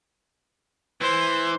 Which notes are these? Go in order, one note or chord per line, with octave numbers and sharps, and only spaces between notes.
E3 C5